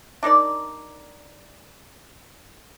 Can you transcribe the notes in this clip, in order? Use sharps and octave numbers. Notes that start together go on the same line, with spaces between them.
D4 D#4 A#4 D5